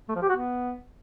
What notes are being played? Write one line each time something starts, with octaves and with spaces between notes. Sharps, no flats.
A3
F3
G4
F#4
B3